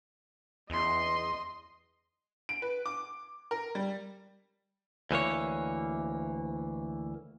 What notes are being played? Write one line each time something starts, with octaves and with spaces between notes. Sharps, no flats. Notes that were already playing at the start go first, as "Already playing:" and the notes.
E2 D#5 C6
D7
B4
D6
A#4
G3
D2 E3 A#3 C#5